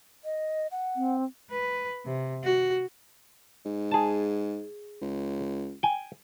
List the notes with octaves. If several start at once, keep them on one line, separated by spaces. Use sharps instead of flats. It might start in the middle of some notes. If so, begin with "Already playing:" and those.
D#5
F#5
C4
B4
C3
F#4
G#2
G#4 A5
C#2
G5 G#5